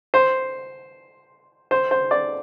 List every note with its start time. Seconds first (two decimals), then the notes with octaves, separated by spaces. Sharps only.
0.14 C5
1.71 C5
1.91 C5
2.11 D5